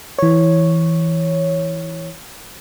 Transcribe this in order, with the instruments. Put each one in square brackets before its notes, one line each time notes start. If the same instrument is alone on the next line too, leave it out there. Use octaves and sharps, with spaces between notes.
[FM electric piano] E3 C#5